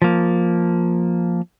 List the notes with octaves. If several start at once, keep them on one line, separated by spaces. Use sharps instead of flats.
F3 A#3